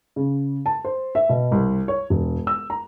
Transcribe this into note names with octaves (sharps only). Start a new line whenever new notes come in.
C#3
A5
C5
E5
B2
C2
C#5
E1
E6
A#5